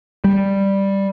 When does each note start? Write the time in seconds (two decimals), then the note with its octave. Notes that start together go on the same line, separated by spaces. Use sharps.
0.24 G3